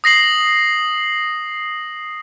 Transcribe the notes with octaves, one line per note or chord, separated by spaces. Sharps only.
D#6 A#6 C7 F#7